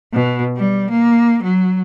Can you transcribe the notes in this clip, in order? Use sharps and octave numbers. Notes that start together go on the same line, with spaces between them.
B2
G3
A#3
F#3